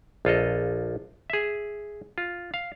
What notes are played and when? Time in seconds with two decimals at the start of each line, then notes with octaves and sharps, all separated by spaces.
0.25 A#1 F4 A4 D#5
1.30 G#4 E5
2.18 F4
2.54 F5